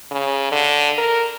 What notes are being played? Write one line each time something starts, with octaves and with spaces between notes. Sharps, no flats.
C#3
D3
A#4